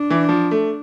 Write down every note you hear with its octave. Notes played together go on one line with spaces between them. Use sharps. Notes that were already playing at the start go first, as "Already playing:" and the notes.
Already playing: D4
E3
F3
A3